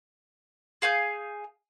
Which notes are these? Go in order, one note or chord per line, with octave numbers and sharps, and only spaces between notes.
G#4 F5 G#5 G6